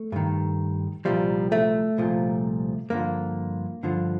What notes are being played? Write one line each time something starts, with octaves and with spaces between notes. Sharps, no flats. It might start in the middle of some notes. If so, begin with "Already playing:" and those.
Already playing: A3
G2 D#3
C2 A#2 F3 G3
A3
C2 A#2 F3
G2 D3 F3 A#3
G2 D3 F3